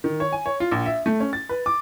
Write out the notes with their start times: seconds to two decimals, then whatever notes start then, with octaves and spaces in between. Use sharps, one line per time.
0.04 D#3
0.20 C#5
0.32 G#5
0.46 C#5
0.60 F4
0.71 A#1
0.86 E5
1.06 A3
1.20 C#4
1.33 A6
1.49 B4
1.66 D6